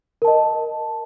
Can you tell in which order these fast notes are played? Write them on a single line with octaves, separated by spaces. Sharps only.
A#4 A5 D#5